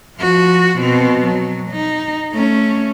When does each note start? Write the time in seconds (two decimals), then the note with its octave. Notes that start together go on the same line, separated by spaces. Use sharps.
0.18 F3 F#4
0.78 B2 C4
1.25 F#3
1.71 D#4
2.32 A3 C#4